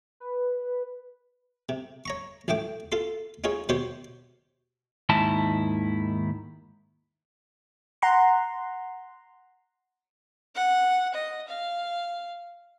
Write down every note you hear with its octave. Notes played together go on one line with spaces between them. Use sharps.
B4
C3
C#5 A#5 C#6
A1 A2 A3 G5 D6
F4 A4 C6
D#4 F4 G#4 C#5
B2 D#3 G4 C5 C#5
D#2 G#2 D#3 E4 A5
F#5 A#5 C6
F#5
D#5
F5